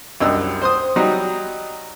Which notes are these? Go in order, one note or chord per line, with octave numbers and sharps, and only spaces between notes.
C2 F#2 D4 D#5 E6
C5 C6 D#6
F#3 G3 D#4